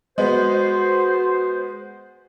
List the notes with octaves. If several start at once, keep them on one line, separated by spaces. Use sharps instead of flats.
G#3 B3 F#4 C5